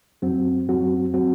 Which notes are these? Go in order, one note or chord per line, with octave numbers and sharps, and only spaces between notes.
F#2 F#3 C4 F#4
F#2 F#3 C4 F#4
F#3 C4 F#4